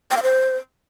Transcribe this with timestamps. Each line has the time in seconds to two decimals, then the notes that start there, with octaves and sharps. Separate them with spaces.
0.11 G5
0.17 F5
0.23 C5